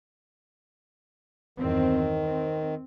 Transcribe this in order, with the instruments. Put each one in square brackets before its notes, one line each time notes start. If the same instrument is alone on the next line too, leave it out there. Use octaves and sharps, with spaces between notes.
[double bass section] E2 G2 C4 [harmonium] D#3
[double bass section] C4